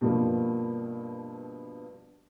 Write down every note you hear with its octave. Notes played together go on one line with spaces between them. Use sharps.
G2 B2 F3 G3 A#3